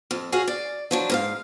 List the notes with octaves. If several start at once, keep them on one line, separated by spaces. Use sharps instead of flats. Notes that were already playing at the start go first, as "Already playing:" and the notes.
F2
F#4 G#4 C#5 F5
D5
F3 F#3 D4
G#2 A#4 F5